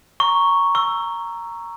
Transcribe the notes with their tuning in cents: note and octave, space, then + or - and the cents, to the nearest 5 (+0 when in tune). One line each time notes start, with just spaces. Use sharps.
A#5 +0 C#6 +0
C#6 +0 E6 +15